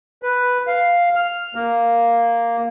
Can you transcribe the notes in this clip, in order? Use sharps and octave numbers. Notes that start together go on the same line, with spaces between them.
B4
F5
F6
A#3